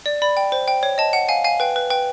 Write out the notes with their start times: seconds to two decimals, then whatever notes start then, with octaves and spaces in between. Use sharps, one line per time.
0.06 D5
0.22 D5 B5
0.37 G5
0.52 C5
0.68 G5
0.83 C#5
0.98 D#5 A5
1.13 F#5
1.29 F5 G#5
1.44 F5 G#5
1.60 B4 G5
1.76 B4
1.90 B4 G5